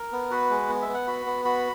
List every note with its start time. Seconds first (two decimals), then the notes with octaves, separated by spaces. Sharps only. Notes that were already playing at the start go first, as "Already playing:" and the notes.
Already playing: A#4
0.12 B3
0.31 F#4 B4
0.50 G#3
0.69 B3
0.82 E5
0.88 B3
0.94 F#5
1.07 F#4 B5
1.26 B3
1.45 F#4 B5